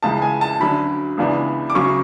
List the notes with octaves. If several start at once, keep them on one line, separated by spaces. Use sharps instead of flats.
C#2 C#3 E3 G#3 A5
G#5
A5
D2 D3 F#3 C#4 B5
C#2 C#3 E3 B3 D4
D6
D2 C#3 F#3 C#4 C#6